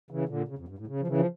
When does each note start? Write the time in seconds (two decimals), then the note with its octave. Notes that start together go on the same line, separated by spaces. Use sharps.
0.11 C#3 E3
0.29 A#2 D3
0.48 C#3
0.58 F2
0.68 G2
0.78 A2
0.87 C#3
1.00 F3
1.07 C#3 E3
1.18 F3